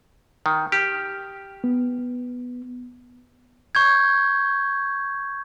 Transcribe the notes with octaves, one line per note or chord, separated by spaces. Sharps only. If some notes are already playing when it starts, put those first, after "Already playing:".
D#3
G4 F6
B3
C#6 G6 G#6